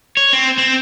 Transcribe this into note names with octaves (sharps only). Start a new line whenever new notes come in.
C#5
C4
C4